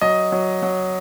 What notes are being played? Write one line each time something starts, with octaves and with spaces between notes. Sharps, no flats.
F#3 D#5
F#3
F#3